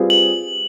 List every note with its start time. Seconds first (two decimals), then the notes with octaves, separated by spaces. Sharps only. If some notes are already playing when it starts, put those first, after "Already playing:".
Already playing: G3 C4 F4 G#4 B4
0.10 F#7